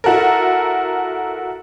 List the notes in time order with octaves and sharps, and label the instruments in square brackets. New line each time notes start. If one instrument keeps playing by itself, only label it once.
[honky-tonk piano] E4 F#4 A4 A#4